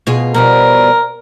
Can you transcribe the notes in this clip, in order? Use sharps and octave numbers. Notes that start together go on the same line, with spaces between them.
B2 F4 G#4
B2 F3 G3 A#4